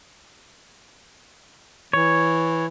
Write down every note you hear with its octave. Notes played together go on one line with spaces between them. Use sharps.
E3 C#5